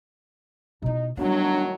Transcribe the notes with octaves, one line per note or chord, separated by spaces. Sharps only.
B2 D#4 E4
A2 D#3 F#3 G3 B3 D4